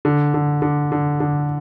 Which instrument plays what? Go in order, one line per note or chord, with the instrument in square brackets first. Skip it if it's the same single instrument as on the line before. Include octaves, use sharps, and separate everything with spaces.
[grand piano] D3
D3
D3
D3
D3